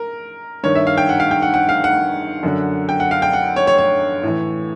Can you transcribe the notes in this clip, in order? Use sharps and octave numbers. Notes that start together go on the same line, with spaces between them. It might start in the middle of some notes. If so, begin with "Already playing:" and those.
Already playing: A#4
G2 D#3 C#5
E5
F5
G5
F#5
F5
G5
F#5
F#5
F5
F#5
F#2 D3
G5
F#5
F5
G5
F#5
C#5
C#5
C#5
A2 E3